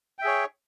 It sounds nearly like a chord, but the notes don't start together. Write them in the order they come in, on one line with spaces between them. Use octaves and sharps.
G5 E5 G#4 C#5